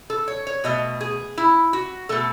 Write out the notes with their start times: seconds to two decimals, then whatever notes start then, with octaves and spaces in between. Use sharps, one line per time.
0.10 A4
0.28 C#5
0.47 C#5
0.64 B2 A3 D#5
1.01 G#4
1.38 E4
1.73 F#4
2.09 B2 A3 A4